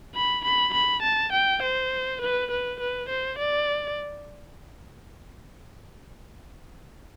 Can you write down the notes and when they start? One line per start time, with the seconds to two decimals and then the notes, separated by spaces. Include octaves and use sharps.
0.15 B5
0.45 B5
0.74 B5
1.03 A5
1.33 G5
1.63 C5
2.21 B4
2.51 B4
2.80 B4
3.09 C5
3.38 D5